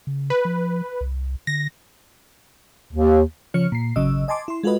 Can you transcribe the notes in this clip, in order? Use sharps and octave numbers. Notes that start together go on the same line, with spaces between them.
C#3
B4
F3
C2
D3 A#6
D#2
C#3 F3 C#5 F6 C#7
A#2 C7
G#1 C#3 F#3 D#5 E6
D#5 G#5 A5 C6 D6
E4 C6
G#3 F4 F#4 A4 B4 D#5